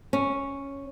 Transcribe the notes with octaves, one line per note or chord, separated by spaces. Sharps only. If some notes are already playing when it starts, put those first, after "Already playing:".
C#4